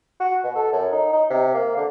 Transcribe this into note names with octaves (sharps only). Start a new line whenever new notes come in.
F#4
B2
A4
F#2
D#4
D#4
C3
A#3
D3